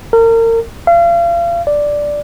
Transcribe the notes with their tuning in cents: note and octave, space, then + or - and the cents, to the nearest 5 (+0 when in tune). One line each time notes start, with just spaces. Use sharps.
A#4 -35
F5 -35
D5 +0